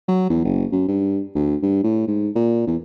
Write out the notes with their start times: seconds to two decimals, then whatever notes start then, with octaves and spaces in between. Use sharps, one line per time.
0.08 F#3
0.30 E2
0.45 F#1
0.72 F#2
0.88 G2
1.35 D2
1.63 G2
1.84 A2
2.08 G#2
2.36 A#2
2.67 E2